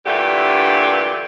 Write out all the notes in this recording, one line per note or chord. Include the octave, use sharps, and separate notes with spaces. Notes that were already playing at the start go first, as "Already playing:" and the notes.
G2 A#2 D3 E3 A3 G4